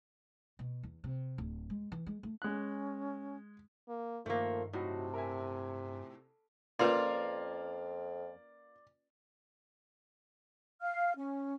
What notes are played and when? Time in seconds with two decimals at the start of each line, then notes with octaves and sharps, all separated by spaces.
0.59 B2
0.83 E2
1.04 C3
1.38 D1
1.70 G#3
1.92 E3
2.06 G#3
2.23 A3
2.42 G#3 C#4 F#6
3.88 A#3
4.26 G2 D#3 F3 A3 A#3
4.73 A2 C3 F#3 D#4 F#4
5.14 A#4 E5 G#5
6.79 F2 A#3 C#4 F4 B4 D5 C6
10.81 F5 F6
11.17 C#4